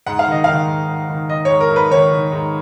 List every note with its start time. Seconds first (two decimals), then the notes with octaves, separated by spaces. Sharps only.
0.07 G#2 F#5
0.19 F5
0.27 D#3 D#5
0.44 D#3 F5
0.67 G#2
0.89 G#2
1.09 D#3
1.30 D#3 D#5
1.45 C#5
1.51 G#2
1.60 A#4
1.70 G#2
1.76 B4
1.91 D#3 C#5
2.12 D#3
2.32 G#2